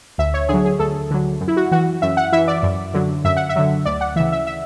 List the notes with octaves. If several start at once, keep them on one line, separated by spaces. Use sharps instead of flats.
D2 E5
C#5
D3 F#3 G#4
G#4
D2 A4
D3 F#3
F#2
E4
F#4
E3 F#4
F#2 E5
F#5
E3 E5
D5
F#2
D3 F#3
F#2 E5
F#5
E5
D3 F#3
D2 D5
F#5
C#3 E3 E5
E5
E5